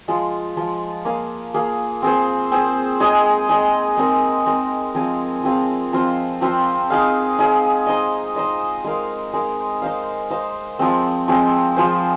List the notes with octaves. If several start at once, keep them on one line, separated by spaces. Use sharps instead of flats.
F3 G#3 F4
F3 G#3 F4
A#3 G#4 F5
A#3 G#4 F5
C4 G#4 C5
C4 G#4 C5
G#3 D#4 G#4 D#5
G#3 D#4 G#4 D#5
G#3 C4 D#4 A#4
G#3 C4 D#4 A#4
F3 C4 G#4 F5
F3 C4 G#4 F5
F3 C4 F4 C5
F3 C4 F4 C5
D#4 G#4 F5
D#4 G#4 F5
D#4 C5 D#5
D#4 C5 D#5
G#3 D#4 A#4 F5
G#3 D#4 A#4 F5
D#4 C5 F5
D#4 C5 F5
F3 G#3 C4
F3 G#3 C4
F3 G#3 F4 C5